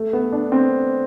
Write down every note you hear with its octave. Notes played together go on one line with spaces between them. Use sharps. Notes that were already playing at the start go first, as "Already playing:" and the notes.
Already playing: A3
B3
D4
C4